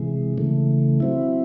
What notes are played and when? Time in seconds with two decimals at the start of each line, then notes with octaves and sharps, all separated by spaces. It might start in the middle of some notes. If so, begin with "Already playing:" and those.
Already playing: C3 E3 G#3
0.38 C#3 E3 A3
1.00 F#3 C4 E4